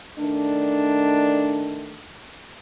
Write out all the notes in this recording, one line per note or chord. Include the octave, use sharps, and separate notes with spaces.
D#3 A3 D4